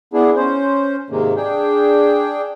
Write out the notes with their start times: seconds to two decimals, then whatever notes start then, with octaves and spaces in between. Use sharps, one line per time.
0.14 B3 D4 E4 G#4
0.36 C#4 C5
1.10 G#2 C3 D#3 G#3 A#3
1.36 D4 G#4 G5